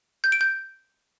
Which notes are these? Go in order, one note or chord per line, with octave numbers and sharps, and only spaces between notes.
G6
D7
G6